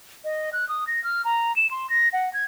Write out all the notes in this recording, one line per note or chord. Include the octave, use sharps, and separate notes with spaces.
D#5
F#6
D#6
A#6
F6
A#5
E7
C6
A#6
F#5
G#6